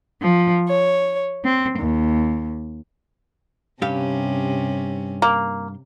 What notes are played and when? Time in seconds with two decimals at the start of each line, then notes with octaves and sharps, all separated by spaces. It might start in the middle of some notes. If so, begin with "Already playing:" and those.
0.22 F3
0.67 C#5
1.45 C4
1.79 D#2
3.82 G2 C3 C#4 G4 F5
5.22 A#3